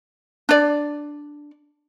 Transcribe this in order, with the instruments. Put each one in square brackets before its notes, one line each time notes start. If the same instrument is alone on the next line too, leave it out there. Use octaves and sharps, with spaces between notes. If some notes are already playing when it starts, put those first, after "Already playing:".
[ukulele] D4 D5